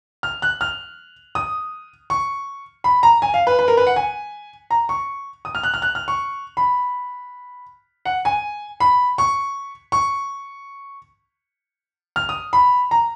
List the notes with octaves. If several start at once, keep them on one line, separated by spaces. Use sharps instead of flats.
F6
F#6
F6
D#6
C#6
B5
A#5
G#5
F5
B4
B4
A#4
B4
F#5
G#5
A#5
C#6
D#6
F6
F#6
F6
F#6
F6
C#6
B5
F#5
G#5
B5
C#6
C#6
F6
D#6
B5
A#5